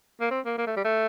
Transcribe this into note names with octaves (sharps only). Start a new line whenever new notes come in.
A#3
C4
A#3
A#3
A3
G3
A3